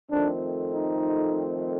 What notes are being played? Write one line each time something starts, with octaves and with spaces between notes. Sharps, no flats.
F2 D#3 A3 C4 D4
D#4